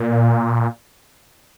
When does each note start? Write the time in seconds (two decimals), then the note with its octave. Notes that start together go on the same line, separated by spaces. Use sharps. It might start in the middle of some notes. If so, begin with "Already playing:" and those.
Already playing: A#2